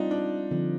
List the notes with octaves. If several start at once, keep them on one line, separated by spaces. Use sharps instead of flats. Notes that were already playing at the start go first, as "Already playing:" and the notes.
Already playing: G3 C4 D4 D#4 F4
D4
D3 F3 C4